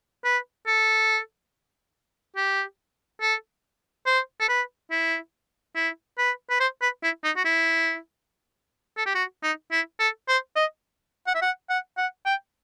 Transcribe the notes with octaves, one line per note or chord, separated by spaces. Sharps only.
B4
A4
G4
A4
C5
A4
B4
E4
E4
B4
B4
C5
B4
E4
D#4
F#4
E4
A4
G4
F#4
D#4
E4
A4
C5
D#5
F#5
E5
F#5
F#5
F#5
G5